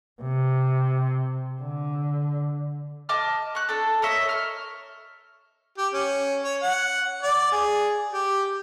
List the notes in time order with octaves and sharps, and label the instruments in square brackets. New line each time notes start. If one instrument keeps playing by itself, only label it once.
[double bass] C3
D3
[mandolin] D#5 A5 D6 F6
C#6 F#6
D4 A4
A#4 C#5 D#5 E5
C#6 F6
[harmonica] G4
C#4
C#5
F#5
D5
G#4
G4